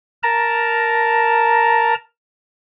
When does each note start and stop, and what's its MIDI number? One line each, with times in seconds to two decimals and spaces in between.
0.23 1.95 70
0.23 1.95 81
0.23 1.95 82